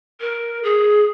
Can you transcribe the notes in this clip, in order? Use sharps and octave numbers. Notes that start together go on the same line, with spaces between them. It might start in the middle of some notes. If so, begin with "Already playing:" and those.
A#4
G#4